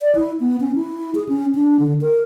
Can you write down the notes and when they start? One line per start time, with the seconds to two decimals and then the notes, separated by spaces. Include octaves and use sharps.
0.01 D5
0.15 E4
0.40 B3
0.60 C#4
0.75 E4
1.15 G#4
1.29 C#4
1.55 D4
1.79 D3
2.01 A#4